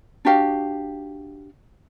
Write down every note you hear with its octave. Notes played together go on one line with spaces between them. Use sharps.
D4 F#4 G4 F5